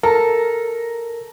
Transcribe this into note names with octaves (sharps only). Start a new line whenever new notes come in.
A4 A#4 A#5